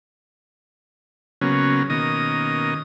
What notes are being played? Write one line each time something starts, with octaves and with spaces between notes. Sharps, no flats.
C#3 F#3 A#3 B3 C#4
B2 D#3 A#3 C#4 D#5 D#6